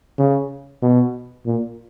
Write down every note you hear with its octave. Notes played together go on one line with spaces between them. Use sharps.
C#3
B2
A#2